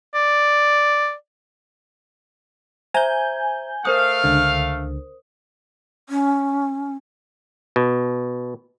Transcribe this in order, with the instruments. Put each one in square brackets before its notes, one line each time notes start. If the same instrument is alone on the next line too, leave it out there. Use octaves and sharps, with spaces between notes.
[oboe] D5
[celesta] C5 E5 A#5 [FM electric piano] G#5 G6
[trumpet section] A3 F5 [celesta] A#4 C5 D#6
[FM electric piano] C#2 D3
[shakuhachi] C#4
[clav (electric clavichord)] B2